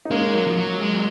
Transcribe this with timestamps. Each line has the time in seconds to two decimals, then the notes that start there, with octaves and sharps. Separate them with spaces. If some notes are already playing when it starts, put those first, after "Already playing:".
0.05 D#4
0.10 G#3 A#3 C#4
0.34 F#3
0.47 F3
0.56 F#3
0.80 G#3
0.93 F#3